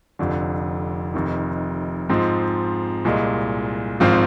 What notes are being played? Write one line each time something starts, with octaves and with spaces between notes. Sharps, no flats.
F1 F2 D3
F1 F2 D#3
G#2 F3 G#3 C4
C2 A#2 G#3
G#1 G#2 F3 C4 F4